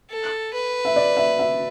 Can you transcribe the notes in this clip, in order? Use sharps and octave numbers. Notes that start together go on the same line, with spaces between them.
A4
B4
E5
D5
E5
E5